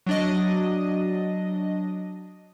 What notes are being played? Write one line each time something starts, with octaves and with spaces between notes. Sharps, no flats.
F#3 D4 D#5